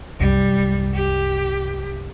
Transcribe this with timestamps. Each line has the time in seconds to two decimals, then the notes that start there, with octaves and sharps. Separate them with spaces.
0.19 C2 F#2 G3
0.95 G4